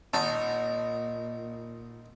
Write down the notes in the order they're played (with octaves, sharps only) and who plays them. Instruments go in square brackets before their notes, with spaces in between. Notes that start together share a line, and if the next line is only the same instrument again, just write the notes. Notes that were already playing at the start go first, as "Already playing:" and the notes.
[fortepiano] G#1 A5 [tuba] A#2 [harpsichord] D#4